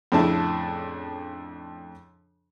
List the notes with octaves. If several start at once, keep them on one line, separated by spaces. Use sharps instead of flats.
F2 A2 C#3 D4 E4 A5